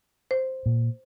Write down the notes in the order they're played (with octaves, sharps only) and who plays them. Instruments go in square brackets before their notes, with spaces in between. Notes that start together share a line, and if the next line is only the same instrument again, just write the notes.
[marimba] C5
[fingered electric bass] A#2